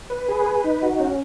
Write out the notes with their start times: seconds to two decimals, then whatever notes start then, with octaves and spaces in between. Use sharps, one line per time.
0.10 B4
0.29 G#4
0.46 B4
0.64 D#4
0.82 F#4
1.00 C#4